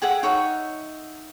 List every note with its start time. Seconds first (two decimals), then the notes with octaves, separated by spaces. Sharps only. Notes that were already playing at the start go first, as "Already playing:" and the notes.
0.02 G4 G#4 E5 F#5
0.23 D#4 C#5 E5 F#5